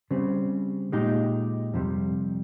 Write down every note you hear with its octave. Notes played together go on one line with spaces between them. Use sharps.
C#3 G3 C4
A#2 G#3 D#4 G4
F2 C3 G3